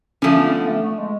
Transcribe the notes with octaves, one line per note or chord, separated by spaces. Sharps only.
D3 F3 A3 C#4
B3
C#4
B3
A3
A3
G#3